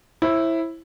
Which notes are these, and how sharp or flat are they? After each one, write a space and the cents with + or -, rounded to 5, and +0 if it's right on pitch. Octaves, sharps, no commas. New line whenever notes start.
E4 +0 C5 +40